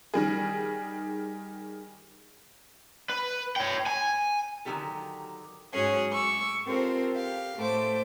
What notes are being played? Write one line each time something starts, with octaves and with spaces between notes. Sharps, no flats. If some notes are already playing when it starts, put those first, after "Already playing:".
D#3 G3 G#4
B4
C#5 G5
G#5
D3 D#3 F#3 C#4 G4 A4
G#2 F#3 C#4 G#4
C#6 D6 E6
C4 F4 G4 A4 A#4 C5
G4 F5
A2 A3 A4 C5 D6